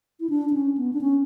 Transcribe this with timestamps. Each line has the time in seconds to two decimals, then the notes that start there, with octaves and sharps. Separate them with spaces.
0.20 E4
0.30 D4
0.49 D4
0.53 C#4
0.77 B3
0.93 D4
1.01 C#4